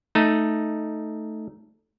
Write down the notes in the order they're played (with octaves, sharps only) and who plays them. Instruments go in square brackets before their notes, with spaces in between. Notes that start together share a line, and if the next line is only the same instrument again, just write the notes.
[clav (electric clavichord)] A3 D#4